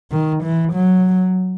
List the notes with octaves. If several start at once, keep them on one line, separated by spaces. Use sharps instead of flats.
D#3
E3
F#3